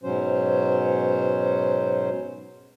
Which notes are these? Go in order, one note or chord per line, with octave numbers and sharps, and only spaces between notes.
G#2 B2 F#3 C#4 C5